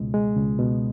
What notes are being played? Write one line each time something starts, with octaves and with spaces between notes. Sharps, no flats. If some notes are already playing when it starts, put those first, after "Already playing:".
Already playing: C#2 B2 G#3
G#3
C#2
B2